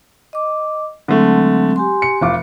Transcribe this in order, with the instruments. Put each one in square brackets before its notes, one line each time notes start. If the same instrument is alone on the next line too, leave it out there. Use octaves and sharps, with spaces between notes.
[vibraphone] D#5 D6
[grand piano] D3 A3 [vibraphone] F#3 G#3 C4
[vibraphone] G4 G#5 C6
[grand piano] C#7
F1 F4 D6